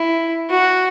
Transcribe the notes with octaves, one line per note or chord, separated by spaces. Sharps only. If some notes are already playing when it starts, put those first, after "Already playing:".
Already playing: E4
F#4